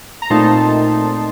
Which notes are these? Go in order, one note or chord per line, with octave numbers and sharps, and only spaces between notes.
A#5
A#2 A3 C4 D#4 A5 C6